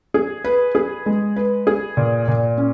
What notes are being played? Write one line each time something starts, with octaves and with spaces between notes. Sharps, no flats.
G#4
B4
G#4
G#3
B4
G#4
A#2
A#2
C#4